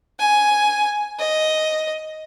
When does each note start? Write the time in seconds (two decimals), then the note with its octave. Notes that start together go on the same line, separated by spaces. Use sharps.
0.20 G#5
1.19 D#5